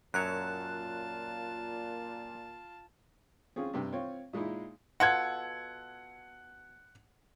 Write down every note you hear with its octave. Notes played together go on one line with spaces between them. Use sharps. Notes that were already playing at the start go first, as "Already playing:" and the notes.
F#2 A#2 F#3 F4 C#5 A5 F#6
C4 C#4 F4 G#4
G2 C3 G5
C4 F4 C#5
A#2 G#3 D#4 E4
B2 F4 A4 F#5 G#6